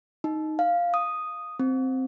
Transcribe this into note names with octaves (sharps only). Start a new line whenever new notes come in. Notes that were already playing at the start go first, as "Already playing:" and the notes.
D#4
F5
D#6
C4